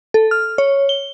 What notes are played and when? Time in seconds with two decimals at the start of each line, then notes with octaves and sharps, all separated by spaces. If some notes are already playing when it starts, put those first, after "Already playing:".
0.14 A4
0.31 F6
0.58 C#5
0.89 G7